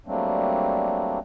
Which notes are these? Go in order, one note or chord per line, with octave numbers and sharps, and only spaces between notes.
F#3 G3 A3 A#3 C4 D4